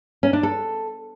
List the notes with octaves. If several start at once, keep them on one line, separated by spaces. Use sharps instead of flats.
C#4
D4
A4